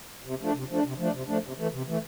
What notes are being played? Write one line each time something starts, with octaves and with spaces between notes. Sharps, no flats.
C3
F3 A3 D4
C3
F3 A3 D4
C3
F3 A3 D4
C3
F3 A3 D4
C3
E3 A3
C3
E3 A3